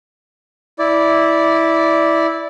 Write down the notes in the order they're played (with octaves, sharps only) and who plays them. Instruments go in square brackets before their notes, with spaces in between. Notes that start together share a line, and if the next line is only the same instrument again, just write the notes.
[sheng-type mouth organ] E4 D5